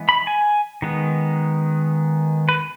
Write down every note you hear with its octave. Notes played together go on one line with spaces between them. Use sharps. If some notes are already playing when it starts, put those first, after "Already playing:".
Already playing: E3 G#3 B3
B5
G#5
D#3 G#3 B3
B4